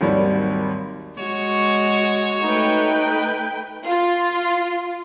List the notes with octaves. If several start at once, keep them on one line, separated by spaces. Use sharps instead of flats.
G#1 D#2 F#3 G3
G#3 F#4 C#5
A3 D#4 B4 G5
F4